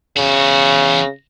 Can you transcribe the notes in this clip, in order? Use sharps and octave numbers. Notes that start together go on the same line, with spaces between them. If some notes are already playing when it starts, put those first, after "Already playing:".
E2 C#3 F#4